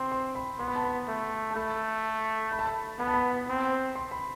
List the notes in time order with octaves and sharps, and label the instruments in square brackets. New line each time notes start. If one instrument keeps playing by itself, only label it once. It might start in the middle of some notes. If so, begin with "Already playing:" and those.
Already playing: [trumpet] C4 [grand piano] C6
[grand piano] C6
B5
[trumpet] B3 [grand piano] C6
[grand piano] B5
A5
B5
[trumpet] A3
[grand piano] A5
[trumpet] A3 [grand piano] B5
[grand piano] B5
A5
B5
[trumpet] B3 [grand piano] B5
[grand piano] A5
B5
[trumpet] C4
[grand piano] C6
B5